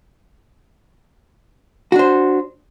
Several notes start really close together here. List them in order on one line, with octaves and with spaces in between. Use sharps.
F#4 D4 C5